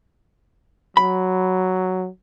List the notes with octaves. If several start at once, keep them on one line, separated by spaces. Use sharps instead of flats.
F#3 B5